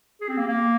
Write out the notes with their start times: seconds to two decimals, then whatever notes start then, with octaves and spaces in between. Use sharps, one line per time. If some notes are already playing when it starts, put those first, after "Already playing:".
0.21 G#4
0.29 C4
0.38 A#3
0.48 A#3